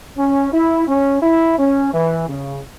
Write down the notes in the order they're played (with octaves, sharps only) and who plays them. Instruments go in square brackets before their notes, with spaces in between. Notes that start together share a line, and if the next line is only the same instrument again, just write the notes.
[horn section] C#4
E4
C#4
E4
C#4
E3
C#3